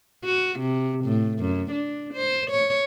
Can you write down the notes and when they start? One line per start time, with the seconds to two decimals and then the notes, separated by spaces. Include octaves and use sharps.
0.25 F#4
0.59 C3
1.05 A2
1.39 F#2
1.71 D4
2.13 C5
2.50 C#5